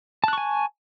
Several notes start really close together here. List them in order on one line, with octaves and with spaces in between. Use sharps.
A5 F#6 C#6 G#5